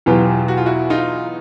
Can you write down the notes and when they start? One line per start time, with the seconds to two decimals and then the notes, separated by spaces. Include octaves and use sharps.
0.06 E2 B2 F#3 F4 G4
0.48 F#4
0.57 F4
0.66 E4 F#4
0.90 D#4 F4